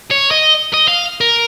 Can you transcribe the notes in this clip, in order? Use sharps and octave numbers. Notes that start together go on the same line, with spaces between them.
C#5
D#5
D#5
F5
A#4